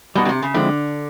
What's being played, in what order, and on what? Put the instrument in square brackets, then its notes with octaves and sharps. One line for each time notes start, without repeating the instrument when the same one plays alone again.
[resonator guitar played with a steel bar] B2 [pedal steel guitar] G3 B3 D#4 F#4
[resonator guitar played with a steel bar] C#3
C3
C#3
[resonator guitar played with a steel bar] D3 [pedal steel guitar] F3 G#3 C4 E4